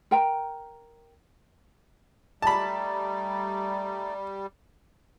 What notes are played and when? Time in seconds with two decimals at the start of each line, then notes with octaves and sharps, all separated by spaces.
0.11 A#4 G5 A#5
2.42 G3 A3 D#4 D5 A5 B5